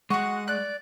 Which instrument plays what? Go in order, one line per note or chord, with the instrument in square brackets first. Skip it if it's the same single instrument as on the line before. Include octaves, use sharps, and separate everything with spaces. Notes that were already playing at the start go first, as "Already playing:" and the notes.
[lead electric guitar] G#3 [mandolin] F#4 C#6 [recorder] F#5
[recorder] D5 [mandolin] F#6